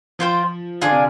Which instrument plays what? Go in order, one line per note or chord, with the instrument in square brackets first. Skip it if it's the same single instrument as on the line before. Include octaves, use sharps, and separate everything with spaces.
[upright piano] F3 [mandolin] F4 C5 G5
[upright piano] D3 [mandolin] D4 F4 G#4 D5
[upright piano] C3